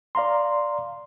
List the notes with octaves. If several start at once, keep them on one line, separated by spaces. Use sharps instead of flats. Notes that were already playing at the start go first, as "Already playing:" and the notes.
D5 F5 A#5 C6